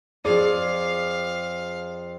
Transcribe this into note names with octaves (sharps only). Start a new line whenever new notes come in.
F2 G#4 D5 F5